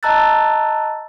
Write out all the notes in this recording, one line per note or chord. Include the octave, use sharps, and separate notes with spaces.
D#5 A5 A#5 E6 F#6 A6